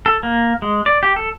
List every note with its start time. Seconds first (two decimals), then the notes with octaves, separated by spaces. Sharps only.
0.06 A4
0.23 A#3
0.62 G#3
0.86 D5
1.03 G4
1.16 A4